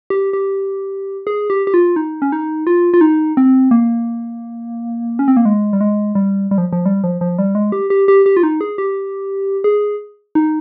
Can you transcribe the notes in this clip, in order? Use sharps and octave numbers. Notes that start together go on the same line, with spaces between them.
G4
G4
G#4
G4
G4
F4
D#4
C#4
D#4
F4
F4
D#4
C4
A#3
C#4
C4
A#3
G#3
G3
G#3
G3
G3
F3
F3
G3
F3
F3
G3
G#3
G4
G4
G4
G4
F4
D#4
G#4
G4
G#4
D#4